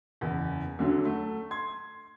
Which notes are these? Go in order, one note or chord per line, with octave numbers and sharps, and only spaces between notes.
F#1 E2
D2 D3 F#3
A3
C6 G#6